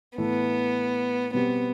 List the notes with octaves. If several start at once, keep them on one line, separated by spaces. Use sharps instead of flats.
A2 E3 A3 B3
B2 G3 B3 C4 G4